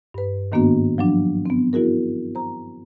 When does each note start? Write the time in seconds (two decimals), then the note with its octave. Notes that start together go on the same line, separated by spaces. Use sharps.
0.14 G2 B4
0.52 G#2 D#3 A#3 B3 D4 F#4
0.98 F3 F#3 D4
1.46 B3 C4
1.73 B3 E4 F#4 G#4 A#4
2.35 C5 A#5